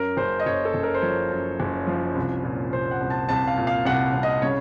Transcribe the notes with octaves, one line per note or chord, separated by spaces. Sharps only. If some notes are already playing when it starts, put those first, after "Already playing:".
Already playing: F#2 A#4
F#1 C5
D#5
F#1 C#5
A4
F#1
A#4
C5
F3 C#5
F#2
F#1
F3
C2
A#2
C2 C5
F#5
C2
A5
C2 A5
F5
A#2
F5
C2 F#5
C2
D#5
C#3 C#5